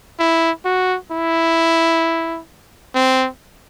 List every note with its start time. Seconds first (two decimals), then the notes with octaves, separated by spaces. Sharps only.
0.19 E4
0.65 F#4
1.12 E4
2.95 C4